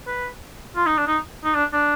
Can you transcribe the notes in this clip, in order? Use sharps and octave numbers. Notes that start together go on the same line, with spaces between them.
B4
F4
D#4
D4
D#4
D#4
D4
D4